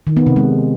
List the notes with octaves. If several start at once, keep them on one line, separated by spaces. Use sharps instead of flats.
D#3
B3
C3
G#3